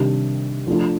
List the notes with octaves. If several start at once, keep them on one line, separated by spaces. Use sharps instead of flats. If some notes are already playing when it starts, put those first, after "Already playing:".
Already playing: C3 D#3 G3 D4 G4
F3 A3 D4 F4